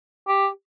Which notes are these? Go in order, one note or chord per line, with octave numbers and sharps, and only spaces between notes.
G4